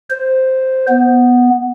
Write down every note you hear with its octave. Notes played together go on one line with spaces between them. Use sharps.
C5
B3